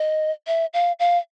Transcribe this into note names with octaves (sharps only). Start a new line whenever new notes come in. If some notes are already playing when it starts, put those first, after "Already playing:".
Already playing: D#5
E5
F5
F5